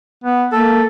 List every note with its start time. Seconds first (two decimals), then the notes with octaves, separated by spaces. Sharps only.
0.24 B3
0.52 A#3 A4